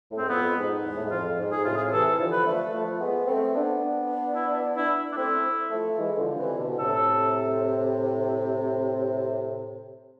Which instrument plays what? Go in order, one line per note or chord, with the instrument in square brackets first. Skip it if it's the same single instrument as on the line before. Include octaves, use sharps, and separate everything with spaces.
[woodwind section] A2
[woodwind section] G#2 [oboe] C4
[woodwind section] F2 [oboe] B3
[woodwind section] G#2
E2
A2
G#2
[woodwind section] F2 [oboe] F4
[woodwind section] G#2
[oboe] G#4
[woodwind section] A2 C3 [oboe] F4
[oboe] G#4
[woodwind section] C3 E3 [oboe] A4
[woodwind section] D3 F3
[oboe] B4
[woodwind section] F3 A3
F3 A3
G#3 B3
A3 C4
B3 D4
[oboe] E4
E4
D4
[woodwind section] A3 C4 [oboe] E4
[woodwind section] F3 A3
E3 G#3
D3 F3
C3 E3
B2 D3
[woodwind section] A2 C3 [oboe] A4